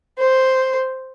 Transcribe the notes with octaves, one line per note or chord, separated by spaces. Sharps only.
C5